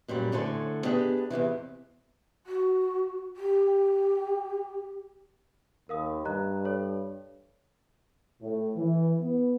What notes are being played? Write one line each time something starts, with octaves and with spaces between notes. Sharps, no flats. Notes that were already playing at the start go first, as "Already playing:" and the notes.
F#2 A#2 F#3 G3
A2 D3 A4 C5 G#5
B3 D4 G4 G#4
E2 G2 C3 E3
F#4
G4
D#2 A#4 F5 D#6
G2 D#5 A#5 F#6
A4 C#5
A2
E3
B3